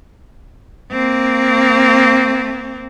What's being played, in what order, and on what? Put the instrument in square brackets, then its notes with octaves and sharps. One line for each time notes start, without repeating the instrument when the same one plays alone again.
[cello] A#3 C4